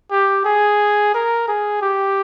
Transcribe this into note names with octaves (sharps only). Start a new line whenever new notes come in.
G4
G#4
A#4
G#4
G4